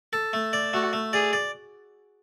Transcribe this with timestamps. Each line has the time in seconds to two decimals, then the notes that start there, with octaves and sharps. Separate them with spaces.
0.13 A4
0.33 A3
0.53 D5
0.73 A3 F#4
0.93 A3
1.13 G#4 D5
1.33 D5